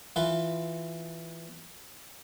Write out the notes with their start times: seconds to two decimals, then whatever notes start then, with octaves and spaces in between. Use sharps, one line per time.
0.16 E3 F4 B4